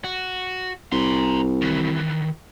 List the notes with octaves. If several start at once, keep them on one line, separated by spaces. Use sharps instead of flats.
F#4
C2 A#5 C6
D#3 E3